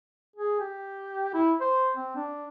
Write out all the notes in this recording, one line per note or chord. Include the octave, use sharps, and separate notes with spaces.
G#4
G4
E4
C5
C4
D4